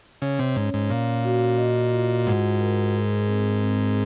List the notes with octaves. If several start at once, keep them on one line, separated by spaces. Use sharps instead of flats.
C#3 C#5
C3
G#2 C#4
G#2
A#2 F5
F#4
D#5
F4
G#2 F#5
A#4
G#4
C4
C4